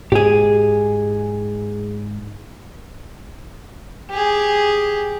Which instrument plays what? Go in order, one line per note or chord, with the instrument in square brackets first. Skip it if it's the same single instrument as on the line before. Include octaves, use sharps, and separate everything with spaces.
[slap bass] G#2 [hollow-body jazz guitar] G4 G#4
[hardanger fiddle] G4 G#4